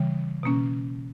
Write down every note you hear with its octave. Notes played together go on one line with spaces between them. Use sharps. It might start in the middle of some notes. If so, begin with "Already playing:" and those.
Already playing: C#3 E3 G3
B2 A#3 C#4